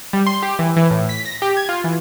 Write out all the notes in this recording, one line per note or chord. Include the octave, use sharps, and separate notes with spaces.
G3
C6
G4
E3
E3
A2
B6
A#6
G4
G#6
F4
E3